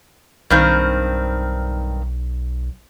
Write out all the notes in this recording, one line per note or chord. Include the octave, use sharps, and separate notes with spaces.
B1 G2 D#3 C4